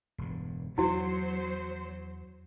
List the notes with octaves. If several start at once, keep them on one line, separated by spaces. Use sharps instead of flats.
E1 G2
E2 F#3 E4 F#4 C5